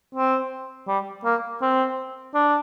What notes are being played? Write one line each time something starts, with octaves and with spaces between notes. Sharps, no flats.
C4
G3
A#3
C4
D4